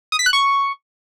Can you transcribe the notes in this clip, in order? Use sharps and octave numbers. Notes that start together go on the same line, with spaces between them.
D#6
B6
F#6
C#6